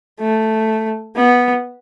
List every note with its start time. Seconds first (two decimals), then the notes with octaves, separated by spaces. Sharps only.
0.20 A3
1.16 B3